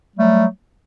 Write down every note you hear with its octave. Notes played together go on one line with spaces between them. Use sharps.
F#3 G3 A3